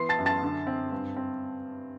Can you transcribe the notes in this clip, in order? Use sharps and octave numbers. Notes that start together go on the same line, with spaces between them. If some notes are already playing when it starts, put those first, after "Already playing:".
Already playing: E3 B3 C6 C7
A5 A6
F#2
A5 A6
D3
C4
G2
C4